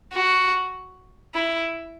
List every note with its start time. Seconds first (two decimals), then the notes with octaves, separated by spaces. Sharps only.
0.13 F#4
1.35 E4